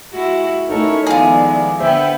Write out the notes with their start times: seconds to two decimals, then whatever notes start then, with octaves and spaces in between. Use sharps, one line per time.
0.13 G#3 E4 F#4
0.70 A3 C#4 D#4 E4 A4 A#4 C#5
1.07 D#3 F3 G#3 B3 E4 F4 G#4 D5
1.80 D3 B3 B4 C5 E5 G5